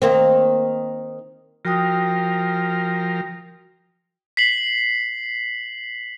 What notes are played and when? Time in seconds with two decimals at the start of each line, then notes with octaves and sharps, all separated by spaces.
0.02 D#3 A#3 C4
1.65 F3 F#4 A#4 G5 D#6
4.37 B6 C7 F#7